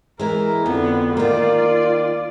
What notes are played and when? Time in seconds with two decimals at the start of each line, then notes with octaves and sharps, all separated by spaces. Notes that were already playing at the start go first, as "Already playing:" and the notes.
0.19 E3 G#3 A#4
0.66 F2 D3 B3
1.17 D#3 A#3 F4 D5